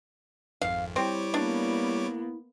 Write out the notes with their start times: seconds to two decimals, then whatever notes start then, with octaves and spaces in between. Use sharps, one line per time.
0.62 G#1 F2 F5
0.96 G3 C4 E4 C#5 D6
1.34 A#3 B3 D4